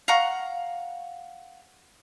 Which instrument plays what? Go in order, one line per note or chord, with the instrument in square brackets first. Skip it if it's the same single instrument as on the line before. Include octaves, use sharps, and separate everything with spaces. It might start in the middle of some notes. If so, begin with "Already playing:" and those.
[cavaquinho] F5 F#5 A#5 C#6